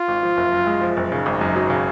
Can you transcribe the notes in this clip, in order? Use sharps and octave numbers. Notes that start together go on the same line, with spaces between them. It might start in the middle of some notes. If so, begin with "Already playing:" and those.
Already playing: F4
G#1
F3
F#1
F#2
G#3
F3
F#1
C#3 D#4
G#1
F#2
F#3
C#3